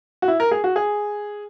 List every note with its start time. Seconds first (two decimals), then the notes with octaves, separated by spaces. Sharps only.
0.22 F#4
0.28 E4
0.40 A#4
0.51 G#4
0.64 F#4
0.76 G#4